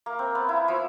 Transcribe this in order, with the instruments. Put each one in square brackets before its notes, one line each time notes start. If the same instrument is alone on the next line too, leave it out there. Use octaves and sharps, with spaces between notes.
[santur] A#3
C4
B3
E4
F3